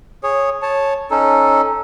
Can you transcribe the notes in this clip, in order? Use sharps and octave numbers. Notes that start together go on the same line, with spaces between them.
G#4 C#5
C#5 A5
C#4 D#4 A4